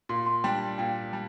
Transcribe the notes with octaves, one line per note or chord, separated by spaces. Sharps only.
A#2 C6
C6
G3 D4 G5
A#2 G5
G3